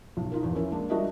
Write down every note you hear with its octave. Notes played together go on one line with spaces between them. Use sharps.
B1
D#4 F4 A#4
A#1 E2
C#4 E4 A#4
G#3 A#3 D4
G3 D4 F#4 A#4 D#5 E5